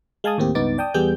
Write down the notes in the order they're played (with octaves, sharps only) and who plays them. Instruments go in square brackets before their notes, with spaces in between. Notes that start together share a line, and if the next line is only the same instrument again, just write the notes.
[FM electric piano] G#3 F5 G#5 A5 D#6
D#2 A2 A#3 C4 G4
C#2 G2 B3 D#4 D6 A6
D5 G5 A5 D#6
E2 G3 B3 G#4 G5 G6